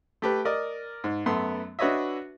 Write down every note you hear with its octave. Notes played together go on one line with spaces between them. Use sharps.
A3 G4 B4
A#4 D5 D#5
G#2
F#2 A3 B3 C6
D4 F#4 B4 C#5 D#5 E5